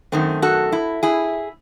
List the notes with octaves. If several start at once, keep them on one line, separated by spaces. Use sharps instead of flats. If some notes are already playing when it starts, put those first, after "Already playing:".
F#2 D#3 A3 C4
F#4 A4
E4
E4 G#4